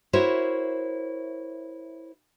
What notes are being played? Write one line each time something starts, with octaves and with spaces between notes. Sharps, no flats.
E4 F#4 A#4 C5 C#5 E5